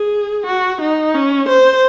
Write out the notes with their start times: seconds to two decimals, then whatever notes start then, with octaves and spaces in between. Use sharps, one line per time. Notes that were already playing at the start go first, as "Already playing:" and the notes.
Already playing: G#4
0.46 F#4
0.81 D#4
1.14 C#4
1.48 C5